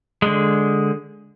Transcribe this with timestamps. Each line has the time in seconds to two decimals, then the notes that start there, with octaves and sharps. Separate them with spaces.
0.22 D3 G#3